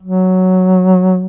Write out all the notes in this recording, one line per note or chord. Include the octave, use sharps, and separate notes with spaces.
F#3